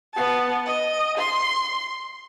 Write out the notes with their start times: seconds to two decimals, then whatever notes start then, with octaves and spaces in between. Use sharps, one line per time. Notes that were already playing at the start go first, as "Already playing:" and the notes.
0.14 B3 A5
0.66 D#5
1.18 C6